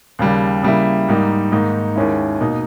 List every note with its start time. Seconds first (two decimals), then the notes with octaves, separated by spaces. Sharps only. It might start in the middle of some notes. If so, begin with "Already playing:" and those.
0.19 D#2 C#3 G3
0.63 C#3 G3 A#3 E4
1.08 G#2 G3 A#3 D#4
1.52 G#2 D#3 A#3 D#4
1.96 D#2 D#3 G#3 C#4 E4
2.40 B2 A#3 D#4